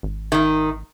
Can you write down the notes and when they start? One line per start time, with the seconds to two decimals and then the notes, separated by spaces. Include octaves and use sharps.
0.03 G#1
0.32 D#3 D#4